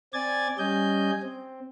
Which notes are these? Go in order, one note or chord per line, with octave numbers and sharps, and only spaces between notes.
C4 D5 G#5 G#6 A6
G3 C#4 D#5 G#5 G6
C4